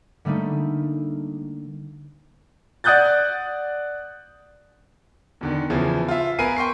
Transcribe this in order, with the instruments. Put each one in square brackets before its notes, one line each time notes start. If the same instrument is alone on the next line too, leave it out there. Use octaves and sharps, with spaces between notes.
[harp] D3 G3 A3 A#3 D#4
[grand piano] D5 F#5 D#6 F#6 G6 A6
E2 D3 D#3
E2 C#3 E3 F3
F4 E5
B3 A#4 B4 G#5 C7 D#7
G5 C6 C#6 C7